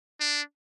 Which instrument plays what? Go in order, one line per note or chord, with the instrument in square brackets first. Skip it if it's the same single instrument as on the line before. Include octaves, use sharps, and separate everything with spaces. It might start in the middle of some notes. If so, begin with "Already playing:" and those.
[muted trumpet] D4